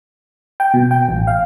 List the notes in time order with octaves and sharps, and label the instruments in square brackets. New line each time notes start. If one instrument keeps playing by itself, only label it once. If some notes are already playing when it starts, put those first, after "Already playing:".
[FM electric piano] G5
B2
G5
A1
F5